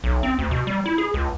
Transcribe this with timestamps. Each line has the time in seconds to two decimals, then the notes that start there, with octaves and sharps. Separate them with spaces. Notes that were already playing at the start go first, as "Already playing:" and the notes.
0.04 B1
0.23 C4
0.39 D2
0.51 B2
0.67 G3
0.86 E4
0.98 G#4
1.14 C#2